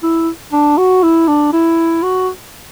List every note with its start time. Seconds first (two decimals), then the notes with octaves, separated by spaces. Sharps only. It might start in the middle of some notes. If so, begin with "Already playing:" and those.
0.03 E4
0.53 D4
0.77 F#4
1.03 E4
1.28 D4
1.53 E4
2.03 F#4